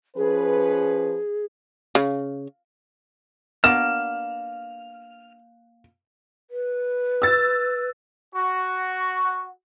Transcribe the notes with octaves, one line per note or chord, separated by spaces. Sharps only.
F3 C#4 G#4 B4
C#3
A#3 B3 D4 F#4 F6 E7
B4
E6 A6
F#4